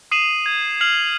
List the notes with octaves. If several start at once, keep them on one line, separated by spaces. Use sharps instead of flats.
D#6 C7 D#7 E7 F#7
G#6
F6 C7 F7 F#7